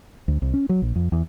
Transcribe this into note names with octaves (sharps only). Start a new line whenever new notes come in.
D2
C2
C#4
F#3
A#1
F2
E2